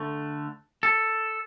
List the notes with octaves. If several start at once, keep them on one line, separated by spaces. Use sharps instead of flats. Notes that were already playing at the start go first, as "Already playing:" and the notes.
Already playing: D3 A3
A4